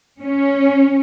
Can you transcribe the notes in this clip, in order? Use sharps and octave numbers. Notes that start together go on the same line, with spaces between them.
C#4